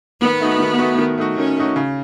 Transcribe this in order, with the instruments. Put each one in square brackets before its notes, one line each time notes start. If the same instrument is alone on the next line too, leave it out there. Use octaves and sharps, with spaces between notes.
[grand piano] D#3 [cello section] B3
[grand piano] A3 D#4 F#4
D#3
A3 D#4 F#4
D#3
A3 D#4 F#4
[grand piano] D#3 [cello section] C#4
[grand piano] A3 D#4 F#4
C#3